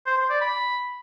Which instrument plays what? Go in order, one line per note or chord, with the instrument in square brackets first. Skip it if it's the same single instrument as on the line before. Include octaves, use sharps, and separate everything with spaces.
[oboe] C5
C5
D5
B5